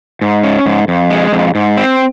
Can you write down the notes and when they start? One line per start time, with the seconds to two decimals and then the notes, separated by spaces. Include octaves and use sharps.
0.21 G#2
0.43 C#4
0.66 G#2
0.88 F2
1.10 G#3
1.33 F2
1.55 G#2
1.77 C4